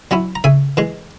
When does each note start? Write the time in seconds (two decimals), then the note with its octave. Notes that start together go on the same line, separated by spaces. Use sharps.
0.11 F#3 C#4 E4
0.35 A#5
0.44 C#3 E5 G#5
0.77 E3 G#3